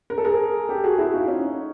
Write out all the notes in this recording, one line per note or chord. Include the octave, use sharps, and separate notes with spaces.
A#4
A4
G#4 A#4
G4 A4
F#4 G#4
E4 F#4
D#4 F4
C#4 D#4